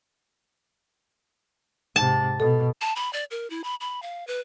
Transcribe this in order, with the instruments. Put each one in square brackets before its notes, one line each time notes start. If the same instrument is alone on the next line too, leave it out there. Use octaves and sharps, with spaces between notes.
[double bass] G#2 C3 [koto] A5
[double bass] B2 [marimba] A4
[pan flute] A5
B5
D5
A#4
E4
B5
B5
F5
B4